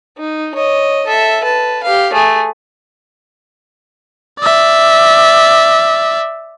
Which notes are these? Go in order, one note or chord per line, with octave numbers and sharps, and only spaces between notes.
D#4
C#5 D#5
A4 E5
B4 A5
G4 F5
A3 G#4
D5 E5